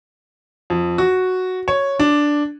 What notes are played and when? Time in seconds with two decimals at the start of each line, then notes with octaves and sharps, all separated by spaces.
0.70 F2
0.98 F#4
1.68 C#5
1.99 D4